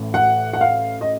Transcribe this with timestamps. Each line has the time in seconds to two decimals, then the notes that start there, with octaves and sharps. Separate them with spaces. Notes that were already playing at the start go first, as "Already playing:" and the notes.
Already playing: A1 A2
0.14 F#5
0.53 F#5
0.61 F5
1.01 D#5